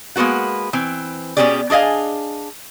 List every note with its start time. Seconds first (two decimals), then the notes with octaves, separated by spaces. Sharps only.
0.16 G#3 A#3 B3 F#4 F#5
0.73 E3 C4
1.37 B2 C4 C#4 G4 G#4 D5
1.70 D4 G#4 D#5 F5 G#5